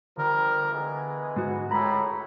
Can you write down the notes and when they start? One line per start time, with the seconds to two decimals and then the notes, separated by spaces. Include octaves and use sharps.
0.17 D3 F3 G3 A#4
0.72 E3 G#3 B3
1.36 G#2 F#4
1.71 C#2 F#2 A2 A#5 B5